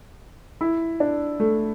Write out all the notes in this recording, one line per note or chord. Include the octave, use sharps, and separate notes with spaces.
E4
D4
A3